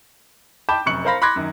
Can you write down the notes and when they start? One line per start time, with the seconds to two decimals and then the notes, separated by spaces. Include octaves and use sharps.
0.69 G5 A5 B5 D6 G6 E7
0.86 F1 F#2 C#6 F#6 C#7 F#7
1.05 A#4 C5 F5 B5 A#6
1.22 B5 C6 D6 F#6 G#6 A#6
1.36 F#2 D#3